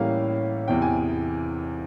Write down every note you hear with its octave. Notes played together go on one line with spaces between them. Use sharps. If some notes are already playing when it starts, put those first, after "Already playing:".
Already playing: A2 E3 G3 A#3 C#4 F5
E2 C3 E3 G5
G#5